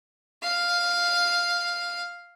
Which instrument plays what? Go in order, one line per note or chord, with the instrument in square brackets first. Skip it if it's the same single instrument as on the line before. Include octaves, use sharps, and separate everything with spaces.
[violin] F5